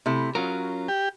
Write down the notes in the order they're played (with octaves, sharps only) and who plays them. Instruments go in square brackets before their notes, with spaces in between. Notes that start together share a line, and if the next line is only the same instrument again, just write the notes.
[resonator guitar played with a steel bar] C3 A3 E4
[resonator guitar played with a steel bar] F#3 [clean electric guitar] C#4 F4 A#4
[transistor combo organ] G4